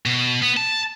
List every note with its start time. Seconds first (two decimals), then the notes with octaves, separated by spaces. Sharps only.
0.06 B2
0.42 B3
0.57 A5